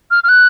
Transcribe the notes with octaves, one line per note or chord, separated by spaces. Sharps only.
F6
F6
F#6